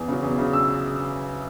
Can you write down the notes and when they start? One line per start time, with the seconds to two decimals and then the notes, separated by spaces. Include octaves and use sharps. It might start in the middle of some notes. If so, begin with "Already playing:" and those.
Already playing: E2
0.08 C#3 F#3
0.23 E2
0.38 C#3 F#3
0.53 E6